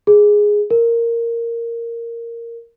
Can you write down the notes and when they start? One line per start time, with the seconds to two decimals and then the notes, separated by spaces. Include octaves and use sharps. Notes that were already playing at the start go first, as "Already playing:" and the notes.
0.07 G#4
0.70 A#4